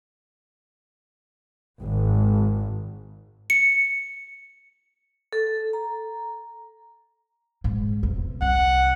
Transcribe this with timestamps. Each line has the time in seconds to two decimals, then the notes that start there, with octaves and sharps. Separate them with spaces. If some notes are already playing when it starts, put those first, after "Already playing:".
1.80 G#1
3.50 C#7
5.33 A4
5.73 A#5
7.64 G#2
8.03 E2 C3
8.42 C2 F#5